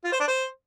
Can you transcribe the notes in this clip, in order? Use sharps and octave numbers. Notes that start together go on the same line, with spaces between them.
F4
C5
D4
C5